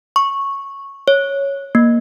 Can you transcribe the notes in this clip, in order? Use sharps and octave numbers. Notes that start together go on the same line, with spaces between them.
C#6
C#5
A#3